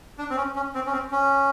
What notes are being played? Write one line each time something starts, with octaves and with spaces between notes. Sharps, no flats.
D4
C4
C#4
C#4
C4
C#4
C4
C#4